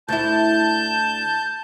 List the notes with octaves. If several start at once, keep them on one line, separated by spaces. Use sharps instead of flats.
D2 E4 A5 G6